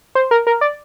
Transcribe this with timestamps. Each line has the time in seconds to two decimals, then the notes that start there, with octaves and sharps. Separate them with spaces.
0.15 C5
0.31 A#4
0.47 A#4
0.61 D5